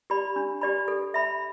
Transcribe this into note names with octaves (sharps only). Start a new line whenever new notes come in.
G4 D5 B5
D4
G4 D5 B5
A4
E5 B5